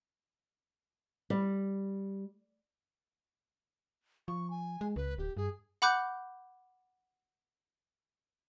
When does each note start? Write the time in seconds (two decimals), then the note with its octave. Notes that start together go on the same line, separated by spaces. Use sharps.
1.30 G3
4.28 F3 C#6
4.50 G#5
4.81 G#3
4.96 C#2 B4
5.18 D1 G4
5.37 G2 G#4
5.82 F#5 B5 D6 F#6 G6